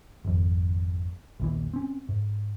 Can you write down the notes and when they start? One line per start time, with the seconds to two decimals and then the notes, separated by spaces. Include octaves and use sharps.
0.25 G#1 F2
1.40 A#1 D#2 E3
1.73 C4 C#4
2.09 G#2